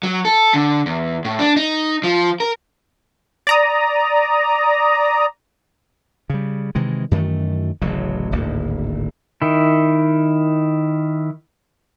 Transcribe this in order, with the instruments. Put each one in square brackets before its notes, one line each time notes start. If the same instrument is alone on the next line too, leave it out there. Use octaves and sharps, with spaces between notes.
[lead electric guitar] F#3
A4
D3
E2
A2
D4
D#4
F3
A#4
[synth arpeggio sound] D5 A#5 D#6
[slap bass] C#3 G3
C3 D#3 E3 G#3
F#2 D#3 E3 A3
D1 A1 C#3 F#3
D1 G#1 D2 A#3
[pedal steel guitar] D#3 E4